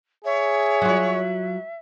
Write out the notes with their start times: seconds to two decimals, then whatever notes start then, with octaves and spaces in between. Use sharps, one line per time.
0.25 G#4 C#5 E5
0.82 F#3 F4